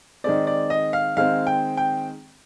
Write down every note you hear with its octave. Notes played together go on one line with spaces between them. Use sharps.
D#3 G#3 C4 D5
D5
D#5
F5
D#3 G#3 C4 F5
G5
G5